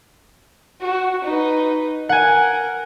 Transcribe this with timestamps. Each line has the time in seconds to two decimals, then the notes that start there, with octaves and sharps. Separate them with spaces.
0.81 F#4
1.24 D#4 B4
2.09 A#4 F#5 G#5